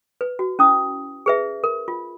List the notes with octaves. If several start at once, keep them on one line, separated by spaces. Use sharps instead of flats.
B4
F#4
C#4 E4 D#6
G#4 B4 E5
A#4
F4